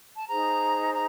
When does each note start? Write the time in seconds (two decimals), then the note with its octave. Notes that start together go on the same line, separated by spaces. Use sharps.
0.16 A5
0.27 D#4 G#4 C5 A#5
0.92 A#5